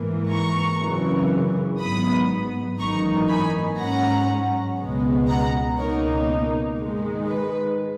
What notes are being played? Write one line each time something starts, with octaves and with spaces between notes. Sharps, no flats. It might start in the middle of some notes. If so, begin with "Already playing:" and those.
Already playing: G#2 E3 A#3
A#5 C#6
G#1 F#2 C#3 E3
G#1 G#2 F#3 B3 B5 D#6
G#1 F#2 E3 A#3 D#4 A#5 C#6
G#5 B5
G#2 F#3 C#4 F#5 A#5
C#2 B2 G#3 B3
F#5 A#5
C#2 B2 A#3 D#4 A#4 C#5
G#2 D#3 G#3
B4